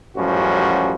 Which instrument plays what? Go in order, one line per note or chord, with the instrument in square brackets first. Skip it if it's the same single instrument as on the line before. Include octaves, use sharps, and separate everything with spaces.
[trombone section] A1 F#2 F3 G3 C#4 F#4